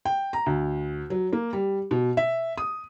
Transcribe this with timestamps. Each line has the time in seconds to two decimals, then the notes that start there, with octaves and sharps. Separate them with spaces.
0.05 G5
0.33 A#5
0.46 D2
1.10 F#3
1.33 A#3
1.53 G3
1.91 B2
2.17 E5
2.58 D#6